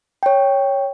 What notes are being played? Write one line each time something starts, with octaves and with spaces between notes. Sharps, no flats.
C#5 G5